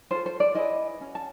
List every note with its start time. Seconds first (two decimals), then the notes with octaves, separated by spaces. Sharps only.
0.11 F4 A4 C5
0.26 C5
0.40 D5
0.55 E4 G#4 B4 D#5
1.00 C#4 F#4
1.15 A5